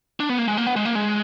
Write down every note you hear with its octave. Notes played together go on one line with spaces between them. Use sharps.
D4
B3
A#3
G#3
A#3
B3
G#3
A#3
G#3